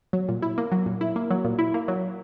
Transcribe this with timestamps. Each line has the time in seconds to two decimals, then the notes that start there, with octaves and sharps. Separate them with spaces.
0.13 F#3
0.28 A#2
0.42 E4
0.58 A#3
0.72 F#3
0.86 A#2
1.01 E4
1.16 A#3
1.30 F#3
1.45 A#2
1.59 E4
1.74 A#3
1.88 F#3